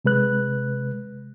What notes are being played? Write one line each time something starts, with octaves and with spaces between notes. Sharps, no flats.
C3 G#3 B4 F#6